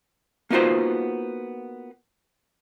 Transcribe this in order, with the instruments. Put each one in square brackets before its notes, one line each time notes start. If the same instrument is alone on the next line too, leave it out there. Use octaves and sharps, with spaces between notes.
[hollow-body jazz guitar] A#3 B3 D#4 F4 F#4 C5